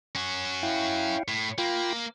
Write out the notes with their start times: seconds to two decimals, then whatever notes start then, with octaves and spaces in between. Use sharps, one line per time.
0.15 C#4 F#4
0.63 E4 F5 G5
1.28 A2
1.58 A#3 F4 G5 B5